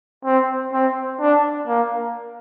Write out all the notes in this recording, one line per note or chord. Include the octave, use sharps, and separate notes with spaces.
C4
C4
D4
A#3